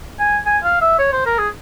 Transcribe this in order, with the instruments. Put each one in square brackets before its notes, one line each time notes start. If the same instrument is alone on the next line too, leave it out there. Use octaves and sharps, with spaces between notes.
[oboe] G#5
G#5
F5
E5
C#5
C5
A#4
G#4